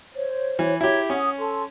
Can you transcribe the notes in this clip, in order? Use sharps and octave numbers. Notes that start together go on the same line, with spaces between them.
C5 C#5
E3
E4 G4 C#5 A#5 G#6
C#4 F#5 G#5 D#6
A4 A5 C6